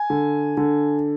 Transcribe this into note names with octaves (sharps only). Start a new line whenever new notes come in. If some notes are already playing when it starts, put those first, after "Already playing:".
Already playing: G#5
D3
D3